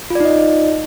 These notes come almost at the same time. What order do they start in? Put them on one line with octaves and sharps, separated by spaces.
F4 D5 D#4 D#5